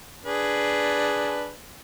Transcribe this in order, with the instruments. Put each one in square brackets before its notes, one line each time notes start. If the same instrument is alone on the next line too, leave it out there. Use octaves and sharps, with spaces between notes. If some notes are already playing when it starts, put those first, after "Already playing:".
[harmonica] D4 G#4 B4